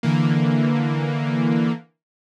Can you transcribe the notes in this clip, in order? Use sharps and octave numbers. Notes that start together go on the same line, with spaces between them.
D3 E3 A#3